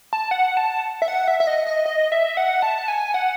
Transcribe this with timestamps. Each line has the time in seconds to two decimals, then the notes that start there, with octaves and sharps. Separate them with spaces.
0.13 A5
0.31 F#5
0.57 A5
1.02 E5
1.08 F#5
1.28 E5
1.40 E5
1.47 D#5
1.67 D#5
1.86 D#5
2.12 E5
2.37 F#5
2.62 A5
2.88 G#5
3.14 F#5